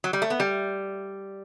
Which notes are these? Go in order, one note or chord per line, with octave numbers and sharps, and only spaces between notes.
F#3
G3
A3
B3
G3